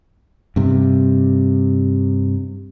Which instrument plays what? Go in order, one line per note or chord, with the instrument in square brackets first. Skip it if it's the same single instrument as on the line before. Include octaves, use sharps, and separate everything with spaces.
[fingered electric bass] G2 C3